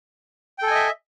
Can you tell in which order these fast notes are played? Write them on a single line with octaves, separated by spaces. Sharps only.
G5 A4 G#5 D#5 E5